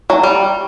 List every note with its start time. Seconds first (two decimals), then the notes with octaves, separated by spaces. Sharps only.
0.10 F#3
0.23 G3